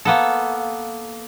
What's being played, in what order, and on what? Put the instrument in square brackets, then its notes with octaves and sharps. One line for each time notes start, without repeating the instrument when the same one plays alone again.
[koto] A#3 B3 A4